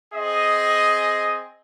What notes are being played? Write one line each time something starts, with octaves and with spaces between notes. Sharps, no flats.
C4 G#4 D#5